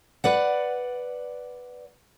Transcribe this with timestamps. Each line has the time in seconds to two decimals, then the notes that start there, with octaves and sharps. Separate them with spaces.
0.24 B4 D5 F#5